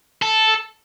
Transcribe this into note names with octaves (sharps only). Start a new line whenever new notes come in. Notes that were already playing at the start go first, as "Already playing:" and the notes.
A4